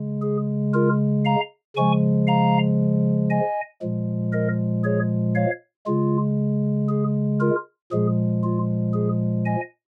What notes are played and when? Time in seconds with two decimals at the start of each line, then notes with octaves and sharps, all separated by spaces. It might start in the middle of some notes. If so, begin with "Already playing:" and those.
Already playing: C#3 G#3
0.22 G#4
0.74 F4 A#4
1.25 F5 A#5
1.76 C#3 F3 G#3 G#5 C#6
2.27 F5 A#5
3.30 D#5 G#5
3.82 A#2 F3 G#3
4.33 A#4 D#5
4.84 G#4 C#5
5.35 C#5 F5
5.86 C#3 G#3 F4
6.89 G#4
7.40 F4 A#4
7.92 A#2 F3 G#3 G#4
8.43 F4
8.94 G#4
9.45 D#5 G#5